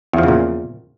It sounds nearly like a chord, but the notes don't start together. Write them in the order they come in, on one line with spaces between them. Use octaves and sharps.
E2 F3 C#3 A#2